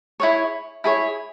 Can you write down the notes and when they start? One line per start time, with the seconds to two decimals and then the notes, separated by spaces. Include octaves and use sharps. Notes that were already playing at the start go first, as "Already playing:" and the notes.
0.20 E4 G#4 C#5
0.84 E4 G#4 C#5